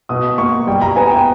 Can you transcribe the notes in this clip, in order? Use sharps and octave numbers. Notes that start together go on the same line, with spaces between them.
B2 D#6
A#3 C#6
G3 G5
A#5
B3 G#5
G5